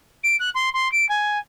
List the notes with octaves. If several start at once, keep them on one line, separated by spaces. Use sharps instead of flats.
D7
F#6
C6
C6
D7
G#5